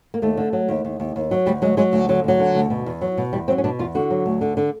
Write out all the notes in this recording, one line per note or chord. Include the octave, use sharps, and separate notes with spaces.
A#3
D#2 A3
D3
F#3
D#2
D#2
D#2
D#2
F#3
D2 G3
F#3 G#3
F#3 G#3
D2
D3 F#3
D2 F#3
D3
D2
B2
E2
F#3
B2
E2 G3
F#3 C4
C#4
B2 D4
E2 F4
D3 F#4
F#3
D2
D3
D3